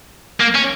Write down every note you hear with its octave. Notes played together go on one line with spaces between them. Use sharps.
A#3
C#4